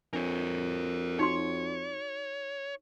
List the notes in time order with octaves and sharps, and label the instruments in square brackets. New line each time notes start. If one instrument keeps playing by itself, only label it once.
[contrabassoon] F2 [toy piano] D4 [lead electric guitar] A#4 C#5
[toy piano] D#4 F#4 C6 [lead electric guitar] C#5